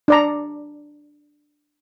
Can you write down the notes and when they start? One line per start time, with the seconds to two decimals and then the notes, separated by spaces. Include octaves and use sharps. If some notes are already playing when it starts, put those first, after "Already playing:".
0.08 D4 D5 A#5